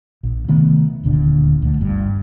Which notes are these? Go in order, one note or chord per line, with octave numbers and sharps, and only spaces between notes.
A#1
C3 D#3 A3 B3
D#1 D2 A#2 D3
D2 D3 A3
G1 G2